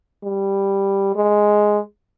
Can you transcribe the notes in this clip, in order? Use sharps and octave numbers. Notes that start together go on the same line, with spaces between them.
G3
G#3